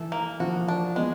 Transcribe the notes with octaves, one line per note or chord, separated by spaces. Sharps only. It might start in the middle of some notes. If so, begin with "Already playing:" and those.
Already playing: E3 A4
A#3
F3 F#4
D4
G#3 B3